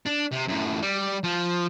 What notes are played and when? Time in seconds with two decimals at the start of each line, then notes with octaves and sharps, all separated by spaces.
0.07 D4
0.32 C3
0.49 F#2 A2
0.83 G3
1.24 F3